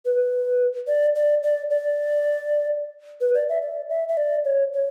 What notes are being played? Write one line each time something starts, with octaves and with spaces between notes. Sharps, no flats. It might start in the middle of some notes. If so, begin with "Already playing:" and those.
B4
D5
D5
D5
D5
B4
D5
E5
D5
E5
E5
D5
C#5
C#5